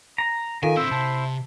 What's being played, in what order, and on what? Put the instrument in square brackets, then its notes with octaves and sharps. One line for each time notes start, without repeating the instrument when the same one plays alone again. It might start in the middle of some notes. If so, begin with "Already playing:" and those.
[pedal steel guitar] A#5
[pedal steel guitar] D#3 [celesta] F4 A4 F5 [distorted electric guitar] G#5
[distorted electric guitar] D3 C4 [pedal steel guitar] E4 C5 [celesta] E6
[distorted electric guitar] C3 [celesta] A5